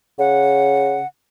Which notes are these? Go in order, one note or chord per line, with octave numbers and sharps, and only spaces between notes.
C#3 F#5